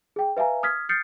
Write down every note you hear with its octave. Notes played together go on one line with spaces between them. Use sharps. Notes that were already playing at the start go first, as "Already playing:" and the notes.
G#4 G5
B4 E5 F5 G#5 A#5
D#6 F6 G#6 B6
D#6 F6 G6 A6 C7 C#7